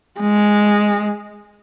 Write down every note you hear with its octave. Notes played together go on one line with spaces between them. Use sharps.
G#3